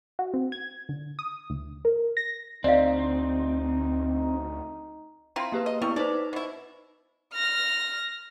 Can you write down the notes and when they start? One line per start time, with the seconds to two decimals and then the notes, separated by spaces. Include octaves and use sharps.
0.19 F#4
0.34 C4
0.52 G#6
0.89 D3
1.19 D#6
1.50 D2
1.85 A#4
2.17 A#6
2.64 D2 C4 D#4 D5 D#5 F5
5.36 C4 E4 F4 A#5 C6
5.52 A#3 G4 B4
5.66 D#5
5.82 G3 B3 C#4 E4
5.96 D#4 B4 C5 D5
6.33 B2 E4
7.34 F6 A#6